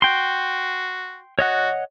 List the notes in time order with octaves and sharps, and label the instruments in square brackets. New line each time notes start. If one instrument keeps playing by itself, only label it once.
[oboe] F#4 [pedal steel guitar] G5 C6
[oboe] F#4 [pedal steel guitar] C#5 D#5 F#5